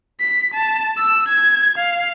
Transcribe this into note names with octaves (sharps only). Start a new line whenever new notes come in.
B6
A5
E6
G#6
F5